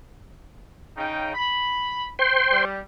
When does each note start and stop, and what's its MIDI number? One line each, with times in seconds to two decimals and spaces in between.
0.97 1.33 49
0.97 1.33 63
0.97 1.33 79
1.35 2.09 83
2.19 2.65 72
2.19 2.65 79
2.19 2.65 84
2.52 2.80 55